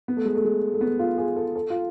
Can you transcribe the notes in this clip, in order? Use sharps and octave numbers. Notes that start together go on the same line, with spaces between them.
B3
A3
G#3
A3
G#3
A3
B3
F4
G#4
A4
A4
F4